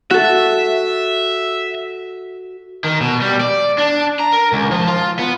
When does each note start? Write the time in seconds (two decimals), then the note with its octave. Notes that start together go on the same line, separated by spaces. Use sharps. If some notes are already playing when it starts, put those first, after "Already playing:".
0.11 F#4 A4 E5
2.84 D#3
3.01 B2
3.21 G3
3.41 D5
3.78 D4
4.19 A#5
4.32 A#4
4.53 C#2
4.71 F3
4.87 F4
5.19 B3